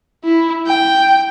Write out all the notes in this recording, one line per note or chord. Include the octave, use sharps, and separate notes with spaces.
E4
G5